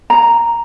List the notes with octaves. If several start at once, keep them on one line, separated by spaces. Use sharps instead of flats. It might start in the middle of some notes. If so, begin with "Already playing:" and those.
A#5